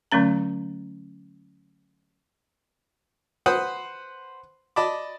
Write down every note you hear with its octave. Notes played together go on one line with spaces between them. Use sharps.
D3 F#3 A3 C#4 A#5
B4 C5 F#5 B5 C6 D#6
D5 D#5 A5 B5 D6